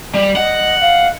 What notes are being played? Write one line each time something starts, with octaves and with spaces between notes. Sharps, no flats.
G3
D#5 F#5
F5